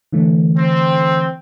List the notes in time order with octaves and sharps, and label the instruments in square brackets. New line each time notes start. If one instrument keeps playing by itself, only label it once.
[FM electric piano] D3 E3 A3
[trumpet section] C4